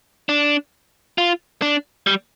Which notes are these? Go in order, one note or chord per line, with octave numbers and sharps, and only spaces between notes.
D4
F4
D4
G3